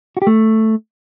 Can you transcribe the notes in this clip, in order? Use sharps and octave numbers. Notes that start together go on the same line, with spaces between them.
F#4
G4
A3